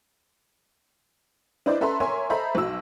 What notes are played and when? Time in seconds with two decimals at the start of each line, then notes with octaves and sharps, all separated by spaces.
1.66 D4 E4 B4 C5 D5 D#5
1.81 C#4 A4 B4 E5 A#5 C6
2.00 A#4 C#5 E5 G#5 A#5 C6
2.30 A4 C5 D#5 E5 A#5 B5
2.55 B1 F#4 E6